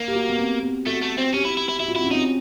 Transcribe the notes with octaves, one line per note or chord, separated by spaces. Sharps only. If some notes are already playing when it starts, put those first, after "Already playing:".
Already playing: A#3
G4
F#4
B3
C4
C4
A3 F#4
A3
C4
C#4 G4
E4
E4
E4
E4 F#4
F4
F#4
C4 E4
C#4
C4 D#4